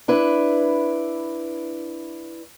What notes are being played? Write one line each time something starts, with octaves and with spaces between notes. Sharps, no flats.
D4 E4 B4